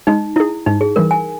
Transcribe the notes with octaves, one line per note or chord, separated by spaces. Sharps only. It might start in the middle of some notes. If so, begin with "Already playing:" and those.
G#3 D#4
D#4 E4 G#4
G#2 D#4
G#4
E3 G3 A#4
G#5